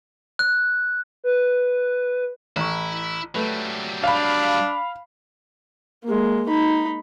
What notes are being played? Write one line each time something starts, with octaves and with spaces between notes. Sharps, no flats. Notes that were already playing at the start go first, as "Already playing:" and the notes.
F#6
B4
A1 E4 C#6
F#3 G3 A3 B4
D4 F5 B5
G#3 A#3
D#4 B5